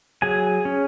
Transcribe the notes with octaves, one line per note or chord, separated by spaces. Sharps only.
F#3 G#4 G#5
C#4